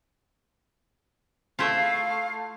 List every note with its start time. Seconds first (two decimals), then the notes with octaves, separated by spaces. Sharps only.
1.59 A3 E4 F4
1.73 F5